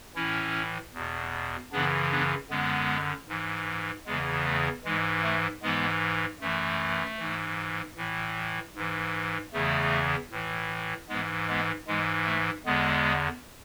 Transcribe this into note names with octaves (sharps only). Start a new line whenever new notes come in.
A2 E3 C#4 E4
E2 B2
F#2 C#3 E3 B3 D4
B3 D4
F#2 D3 G#3 B3
G#2 E3
E2 C#3 E3 G#3 B3
A3
G#2 E3 G#3
A3
G#2 E3 G#3 B3
F#2 E3 A3
G#2 E3
A2 E3
G#2 E3
E2 C#3 E3 A3
A2 E3
G#2 E3 G#3 B3
G#3 B3
G#2 E3 G#3
A3
E2 D3 G#3 B3